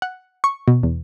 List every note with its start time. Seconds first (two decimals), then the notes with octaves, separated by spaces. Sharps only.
0.02 F#5
0.44 C#6
0.68 B2
0.83 E2